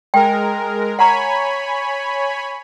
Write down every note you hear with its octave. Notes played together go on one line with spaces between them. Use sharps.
G#3 A#4 G5
C#5 F#5 G#5 A#5 B5